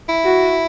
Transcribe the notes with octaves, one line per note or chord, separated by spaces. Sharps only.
E4
F#4